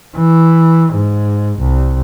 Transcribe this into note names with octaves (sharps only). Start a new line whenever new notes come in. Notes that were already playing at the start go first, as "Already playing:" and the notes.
E3
G#2
C2